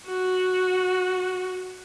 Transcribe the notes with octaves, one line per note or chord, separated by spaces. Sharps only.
F#4